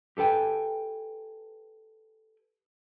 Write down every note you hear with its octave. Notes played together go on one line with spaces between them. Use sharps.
G4 A4 B4 G5 G#5